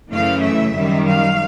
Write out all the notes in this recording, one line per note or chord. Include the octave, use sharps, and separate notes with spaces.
F#2 C#3 E3 A3 C#4 F5
E5
F#2 D#3 G3
F5